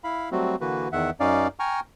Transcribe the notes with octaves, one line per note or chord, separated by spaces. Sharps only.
E4 F5 B5
F#3 G3 A3 C4 F#4
D3 E3 A#3 F#4 B4
E2 D#3 E5 F#5
F#2 C#4 D#4 D5 F5
G5 G#5 A#5 C#6 F6